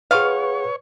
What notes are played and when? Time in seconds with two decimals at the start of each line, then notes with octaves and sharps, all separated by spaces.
0.11 F3 G#4 B4 C#5 F5 F#5 C#6